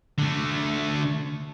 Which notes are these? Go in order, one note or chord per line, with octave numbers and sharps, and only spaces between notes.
D3 A3